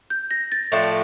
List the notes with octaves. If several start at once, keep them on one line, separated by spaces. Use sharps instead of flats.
G6
A#6
A6
A2 F3 A3 D4